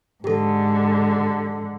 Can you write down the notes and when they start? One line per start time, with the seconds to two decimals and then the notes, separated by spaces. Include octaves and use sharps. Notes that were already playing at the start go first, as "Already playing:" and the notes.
0.24 G#2 D3 G4 A4